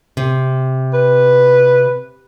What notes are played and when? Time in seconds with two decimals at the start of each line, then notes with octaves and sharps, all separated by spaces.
0.17 C3
0.93 B4